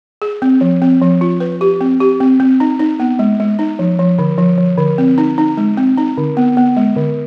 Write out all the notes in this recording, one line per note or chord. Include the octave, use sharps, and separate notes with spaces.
G#4
C4
F3
C4
F3
F4
B4
G4
C4
G4
C4
C4
D#4
D#4
B3
G#3
G#3
D#4
F3
F3
D3
F3
F3
D3
C4
D#4
D#4
G#3
C4
D#4
D3
B3
B3
G#3
D3